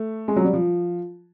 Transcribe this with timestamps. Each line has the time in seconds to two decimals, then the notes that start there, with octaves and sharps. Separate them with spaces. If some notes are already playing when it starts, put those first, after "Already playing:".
Already playing: A3
0.28 G#3
0.36 F#3
0.45 G3
0.53 F3